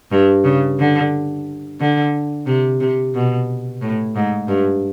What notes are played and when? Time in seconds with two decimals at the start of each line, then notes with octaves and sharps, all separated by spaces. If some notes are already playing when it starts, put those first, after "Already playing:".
0.11 G2
0.44 C#3
0.79 D3
1.80 D3
2.46 C3
2.80 C3
3.14 B2
3.81 A2
4.16 G#2
4.48 G2